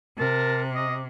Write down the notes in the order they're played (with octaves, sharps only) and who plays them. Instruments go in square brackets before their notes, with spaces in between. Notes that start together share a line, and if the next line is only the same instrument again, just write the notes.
[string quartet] C3 [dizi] A#4 [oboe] A5
[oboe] D#5 [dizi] D6